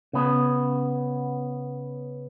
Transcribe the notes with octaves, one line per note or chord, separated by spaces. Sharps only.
C#3 B3